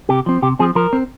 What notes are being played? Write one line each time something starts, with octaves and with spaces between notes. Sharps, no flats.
C3 G4
F3 C4
C3 G4
F3 C4 G#4
F3 A#4
C4